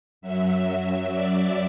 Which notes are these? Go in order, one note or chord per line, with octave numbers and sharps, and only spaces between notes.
F#2 F#3 E5
E5
D5